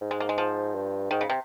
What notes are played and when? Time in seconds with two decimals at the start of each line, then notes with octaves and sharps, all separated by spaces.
0.01 G#2
0.11 G#3
0.20 A#3
0.29 G#3
0.38 F3
0.75 G2
1.11 G#2 D#3
1.21 C#3
1.30 C3